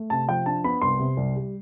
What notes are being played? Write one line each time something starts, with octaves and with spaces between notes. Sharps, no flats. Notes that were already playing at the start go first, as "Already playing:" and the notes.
Already playing: A3
C3 A5
F3 G5
D4 A5
B3 B5
C2 C6
C3
C2
G3